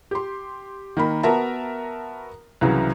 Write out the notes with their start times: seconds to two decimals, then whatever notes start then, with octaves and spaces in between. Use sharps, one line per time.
0.11 G4 C6
0.97 D#3 A#3 B5
1.23 B3 F#4 A#4 E5 A5 A#5
2.61 C2 C#3 E3 F#3